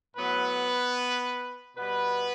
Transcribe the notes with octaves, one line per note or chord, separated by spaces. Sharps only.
A2 F#3 B3 B4
B2 G3 B3 B4